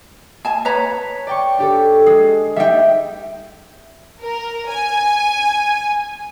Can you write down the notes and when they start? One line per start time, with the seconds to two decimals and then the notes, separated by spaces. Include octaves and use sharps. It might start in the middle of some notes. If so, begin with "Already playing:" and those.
0.45 G#5 A5
0.65 B4 C#5 A#5 B6
1.27 D5 G5 C#6
1.58 D4 G4 A4
2.06 G#3 G#4
2.56 G3 D#4 E5 G5
4.21 A#4
4.68 G#5